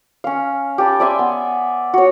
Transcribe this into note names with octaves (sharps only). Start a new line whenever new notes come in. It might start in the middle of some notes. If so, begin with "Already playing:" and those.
C#4 F5
G4 A5 B5
D5 E5 G#5 C6
B3
F#4 C#5